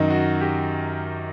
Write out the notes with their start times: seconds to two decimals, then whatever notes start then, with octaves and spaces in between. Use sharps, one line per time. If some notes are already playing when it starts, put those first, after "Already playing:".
Already playing: F#2 D#3 F#3 D#4
0.10 F#4
0.41 G4